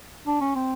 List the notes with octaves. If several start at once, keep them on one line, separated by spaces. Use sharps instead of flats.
D4
C#4
C4